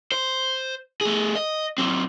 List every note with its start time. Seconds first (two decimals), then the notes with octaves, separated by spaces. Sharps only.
0.12 C5
1.01 A3 G#4
1.35 D#5
1.78 F#3 C4